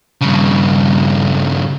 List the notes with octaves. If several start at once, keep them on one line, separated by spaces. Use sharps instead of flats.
G2 C#3